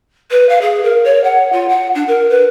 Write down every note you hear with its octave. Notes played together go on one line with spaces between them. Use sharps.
B4
F5
G#4
A#4
C#5
F#5
F4
F#5
D4
A#4
B4